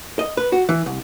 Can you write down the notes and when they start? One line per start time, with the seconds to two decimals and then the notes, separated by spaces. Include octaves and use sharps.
0.19 D#5
0.37 B4
0.52 F#4
0.69 E3
0.86 C2